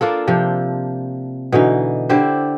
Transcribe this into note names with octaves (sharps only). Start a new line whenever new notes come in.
A#3 D4 F4 A4
C3 F3
B2 D3 E3 D#4
D3 E4 G4 C5